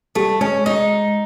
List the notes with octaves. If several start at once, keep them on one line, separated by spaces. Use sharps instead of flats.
G3 A3
G#3 C#4
G#3 D#4